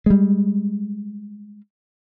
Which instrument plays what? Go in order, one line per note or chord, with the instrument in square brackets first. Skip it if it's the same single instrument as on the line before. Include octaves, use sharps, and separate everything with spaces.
[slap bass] G3 G#3